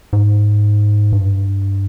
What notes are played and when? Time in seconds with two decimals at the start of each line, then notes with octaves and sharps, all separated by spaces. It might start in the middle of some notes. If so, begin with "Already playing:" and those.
0.13 G#2
1.12 G2